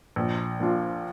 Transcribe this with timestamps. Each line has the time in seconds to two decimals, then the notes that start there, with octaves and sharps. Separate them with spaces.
0.16 A#1
0.60 A#2 F3 D4 F4